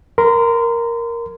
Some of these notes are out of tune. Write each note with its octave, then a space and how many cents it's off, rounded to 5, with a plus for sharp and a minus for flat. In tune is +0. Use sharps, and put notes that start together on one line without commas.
A#4 +0 C6 -35